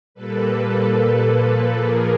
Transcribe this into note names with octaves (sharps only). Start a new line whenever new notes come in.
A#2 G3 A#3 A4 B4
A#2 F3 A#3
G#4 A#4